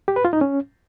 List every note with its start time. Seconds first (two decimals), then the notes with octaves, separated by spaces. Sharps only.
0.08 G4
0.16 B4
0.25 F4
0.33 D#4
0.41 C#4